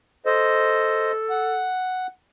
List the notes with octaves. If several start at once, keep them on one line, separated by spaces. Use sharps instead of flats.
A4 C5 D#5
F#5